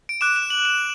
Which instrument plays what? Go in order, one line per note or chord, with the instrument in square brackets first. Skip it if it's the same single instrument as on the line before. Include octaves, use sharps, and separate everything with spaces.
[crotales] D7
D6 F#6 E7
E7
F#7
E7